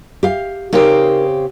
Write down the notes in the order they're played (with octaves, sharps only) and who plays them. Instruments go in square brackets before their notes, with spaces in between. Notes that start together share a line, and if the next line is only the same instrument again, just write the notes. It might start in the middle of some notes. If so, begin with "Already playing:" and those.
[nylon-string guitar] G4 F5
[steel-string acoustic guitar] C#3 C4 G4 [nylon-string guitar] D#4 A#4